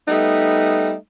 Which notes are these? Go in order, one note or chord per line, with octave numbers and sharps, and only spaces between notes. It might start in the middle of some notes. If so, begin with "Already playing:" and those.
G3 A3 B3 D#4